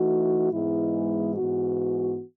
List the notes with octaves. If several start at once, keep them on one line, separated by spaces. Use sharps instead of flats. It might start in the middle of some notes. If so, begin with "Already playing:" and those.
Already playing: E3 A3 D#4 F#4
G#2 E3 G#3 B3 E4
G#2 E3 B3 F#4